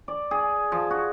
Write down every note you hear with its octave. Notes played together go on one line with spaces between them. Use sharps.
D5
G#4
F3
F#4